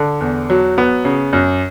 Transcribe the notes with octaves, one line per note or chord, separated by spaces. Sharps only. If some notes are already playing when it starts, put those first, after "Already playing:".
Already playing: D3
E2
F#3
B3
C#3
F#2